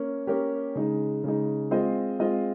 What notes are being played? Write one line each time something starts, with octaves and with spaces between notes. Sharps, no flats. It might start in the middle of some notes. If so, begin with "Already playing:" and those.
Already playing: A#3 C#4
A#3 C#4 G4 A#4
C#3 G#3 D#4
C#3 G#3 D#4
G#3 C4 F4 C5 D#5
G#3 C4 F4 C5 D#5